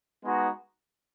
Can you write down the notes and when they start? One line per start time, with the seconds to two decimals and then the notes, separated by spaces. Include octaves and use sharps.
0.24 G#3 B3 D#4 F#4